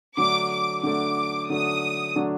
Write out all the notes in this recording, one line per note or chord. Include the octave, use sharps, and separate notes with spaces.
D3 F#3 A3 D4 D6
D6
D3 F#3 A3 D4 D6
D3 F#3 A3 D4 D#6
D3 F#3 A3 D4